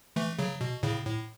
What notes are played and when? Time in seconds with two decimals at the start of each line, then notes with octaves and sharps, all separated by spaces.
0.16 E3 A3
0.39 C#3 F#3
0.61 B2
0.83 A2 C#3
1.05 A2